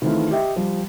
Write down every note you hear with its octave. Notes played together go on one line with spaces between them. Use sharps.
D#3 E3 A3 C4 E4 F4
G4 D#5 E5 G5
F3 G3